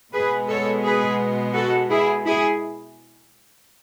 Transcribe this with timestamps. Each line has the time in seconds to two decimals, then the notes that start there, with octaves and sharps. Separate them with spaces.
0.13 B2 G#3 B3 G#4 B4
0.49 A4 C#5
0.84 G#4 B4
1.54 F#4 A4
1.90 E4 G#4
2.26 E4 G#4